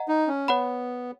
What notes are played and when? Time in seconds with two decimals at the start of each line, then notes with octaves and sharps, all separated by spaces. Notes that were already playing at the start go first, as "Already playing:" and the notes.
Already playing: D#5 F#5 A#5
0.08 D#4
0.27 C#4
0.48 B3 C#5 F#5 B5